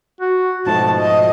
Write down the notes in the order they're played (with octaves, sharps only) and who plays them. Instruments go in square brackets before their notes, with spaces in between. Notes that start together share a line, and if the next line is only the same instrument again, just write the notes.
[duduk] F#4
[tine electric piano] G#2 F3 A3 [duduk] B2 [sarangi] A5
[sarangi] D#5